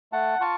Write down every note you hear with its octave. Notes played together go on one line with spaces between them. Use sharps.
A3 F#5 A5
F4 A5 C#6